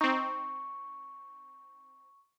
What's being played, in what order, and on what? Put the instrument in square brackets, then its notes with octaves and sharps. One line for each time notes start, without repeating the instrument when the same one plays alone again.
[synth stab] C4 D#4 [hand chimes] C#6